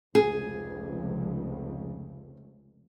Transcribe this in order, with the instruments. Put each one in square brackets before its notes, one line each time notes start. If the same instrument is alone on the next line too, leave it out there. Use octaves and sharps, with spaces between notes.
[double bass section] F1 C#2 [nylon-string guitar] G#4